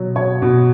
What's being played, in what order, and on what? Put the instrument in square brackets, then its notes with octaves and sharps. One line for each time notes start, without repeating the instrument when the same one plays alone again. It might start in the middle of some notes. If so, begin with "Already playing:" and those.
Already playing: [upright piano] B2 F#3
B2 C#5
B2